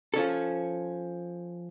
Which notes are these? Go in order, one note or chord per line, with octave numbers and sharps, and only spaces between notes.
F3 C#4 A4